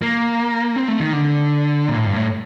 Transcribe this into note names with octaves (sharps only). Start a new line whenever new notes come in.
A#3
C4
A3
D#3
D3
A#2
A2
G2
A2